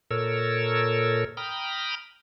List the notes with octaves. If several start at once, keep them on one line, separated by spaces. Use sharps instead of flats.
A#2 A4 A#4 C#5 E6
G5 A#5 B5 D#6 F6